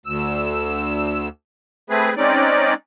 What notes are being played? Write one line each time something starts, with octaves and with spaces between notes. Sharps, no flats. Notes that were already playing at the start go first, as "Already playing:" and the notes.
D2 E6
A3 C4 G#4 B4
G#3 C4 C#4 D#4 D5